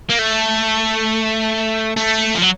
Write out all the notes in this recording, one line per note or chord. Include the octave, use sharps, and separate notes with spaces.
A#3
A3
A3
F3
F#3